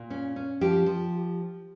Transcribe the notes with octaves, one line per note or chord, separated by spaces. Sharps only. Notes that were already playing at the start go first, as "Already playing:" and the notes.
Already playing: A#2
C#4
C#4
F3 G4
F3